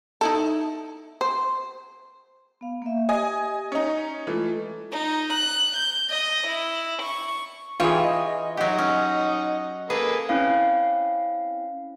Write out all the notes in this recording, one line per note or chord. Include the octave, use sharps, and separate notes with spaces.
D#4 E4 A4
C5
B3 F5
A#3 E5
G4 D#5 G#5
C#4 D#4 D#5 A#5
E3 G#3 A3 F4 A4
D#4
F#6
G6
D#5
E4
C#6
E3 F4 G#4 C#5 G5
D#5
F#3 D#4 G4 F#5
C#4
A#3 G#4 A4 B4
C4 C#4 E4 F5